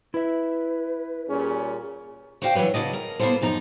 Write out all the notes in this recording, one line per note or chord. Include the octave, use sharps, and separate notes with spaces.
E4 B4 E5
A#2 G3 C#4 G#4
F#4 C5 D5 F5 G5
E3 F#3 D4 B4 C#5
C#3 F#3 D4 D#5
A#4
A#3 B3 C#4 F4 A4 C5
F#2 F3 D#4 A#5